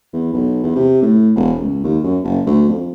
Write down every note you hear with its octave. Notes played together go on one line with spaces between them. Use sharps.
E2
B1
E2
C3
A2
E1
C#2
D#2
F#2
F#1
D2
F2